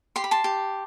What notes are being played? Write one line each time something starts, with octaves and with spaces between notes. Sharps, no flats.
G4 C6
B5
A5 C6
G4